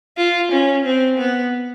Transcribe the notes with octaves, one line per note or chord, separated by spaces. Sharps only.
F4
C#4
C4
B3